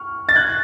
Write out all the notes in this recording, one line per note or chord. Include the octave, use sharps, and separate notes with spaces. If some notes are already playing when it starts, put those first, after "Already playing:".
Already playing: C#6 F6
A6
F#6 G#6